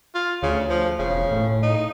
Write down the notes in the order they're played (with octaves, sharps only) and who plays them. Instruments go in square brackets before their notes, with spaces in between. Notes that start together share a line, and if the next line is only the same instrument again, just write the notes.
[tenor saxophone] F4
[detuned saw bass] D2 [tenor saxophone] C#3
[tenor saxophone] F3
[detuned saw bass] E1 [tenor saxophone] C#3
[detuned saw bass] A2
[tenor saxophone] D#4